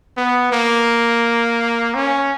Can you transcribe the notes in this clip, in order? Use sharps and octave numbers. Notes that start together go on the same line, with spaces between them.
B3
A#3
C#4